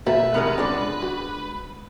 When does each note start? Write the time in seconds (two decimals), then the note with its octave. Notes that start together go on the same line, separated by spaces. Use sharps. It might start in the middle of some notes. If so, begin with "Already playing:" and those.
0.07 A#1 B2 A3 A#4 B4 E5
0.34 C3 D#3 G#3 B3 D#4 A#4 B5
0.58 C#2 G#3 D4 C6
1.02 F#4